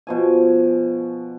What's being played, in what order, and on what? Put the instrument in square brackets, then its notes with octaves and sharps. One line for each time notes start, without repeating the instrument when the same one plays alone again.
[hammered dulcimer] B2 F3 G#5